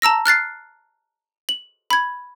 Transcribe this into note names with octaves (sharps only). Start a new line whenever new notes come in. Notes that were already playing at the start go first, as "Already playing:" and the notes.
A5 A#5 E6 A#6
F6 F#6 A6 C7
F#7
B5 G#6